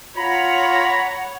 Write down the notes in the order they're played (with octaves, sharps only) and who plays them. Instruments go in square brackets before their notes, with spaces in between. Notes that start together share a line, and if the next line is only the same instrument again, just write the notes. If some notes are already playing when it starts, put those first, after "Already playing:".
[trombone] F4 [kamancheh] C#5 F#5 [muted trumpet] A#5 [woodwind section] B5